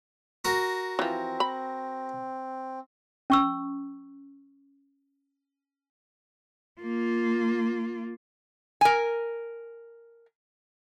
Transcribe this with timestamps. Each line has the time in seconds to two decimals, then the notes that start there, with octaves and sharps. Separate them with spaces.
0.45 F#4 A#4
0.99 E3 F3 C4
1.40 B5
3.30 C#4 C#6 E6
6.81 A#3 F4
8.81 A#4 G#5